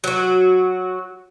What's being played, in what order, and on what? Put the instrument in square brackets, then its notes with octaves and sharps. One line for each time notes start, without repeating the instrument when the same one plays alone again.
[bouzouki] F#3 F#4